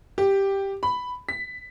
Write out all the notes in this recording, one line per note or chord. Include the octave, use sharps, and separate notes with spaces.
G4
B5
B6